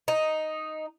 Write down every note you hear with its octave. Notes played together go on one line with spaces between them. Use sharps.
D#4